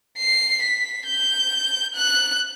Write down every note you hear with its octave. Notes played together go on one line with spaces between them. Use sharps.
C7
B6
G6
F#6